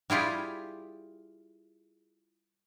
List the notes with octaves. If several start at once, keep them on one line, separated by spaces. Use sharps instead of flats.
G3 E4 F4 G4 G#4